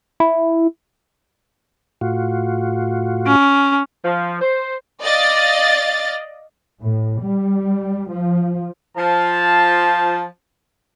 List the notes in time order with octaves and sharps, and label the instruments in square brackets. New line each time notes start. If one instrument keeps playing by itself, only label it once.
[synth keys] E4
[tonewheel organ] A2 F4 F#4
[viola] C#4
[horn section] F3
C5
[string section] D5 D#5 F5 A6
[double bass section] A2
G3
F3
[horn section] F3 A5